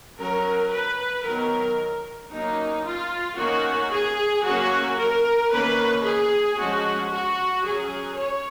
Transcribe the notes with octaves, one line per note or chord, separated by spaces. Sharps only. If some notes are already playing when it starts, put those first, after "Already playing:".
F#3 C#4 A#4
B4
D#3 F#3 B3 A#4
F#3 A#3 C#4 D#4
F4
D#3 A#3 C#4 F#4
G#4
F#3 A#3 C#4 F#4
A#4
D#3 A#3 C#4 B4
G#4
F3 G#3 C#4 F#4
F#4
F#3 C#4 G#4
C#5